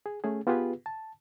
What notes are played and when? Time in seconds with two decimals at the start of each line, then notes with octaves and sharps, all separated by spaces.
0.06 G#4
0.24 A3 C#4 G#4
0.47 B3 F4 G4 G#4 B4
0.86 A5